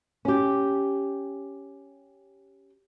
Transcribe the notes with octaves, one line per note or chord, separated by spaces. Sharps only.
C#4 G4